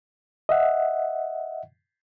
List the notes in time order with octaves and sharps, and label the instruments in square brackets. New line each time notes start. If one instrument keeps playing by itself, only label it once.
[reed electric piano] D#5 E5 F#5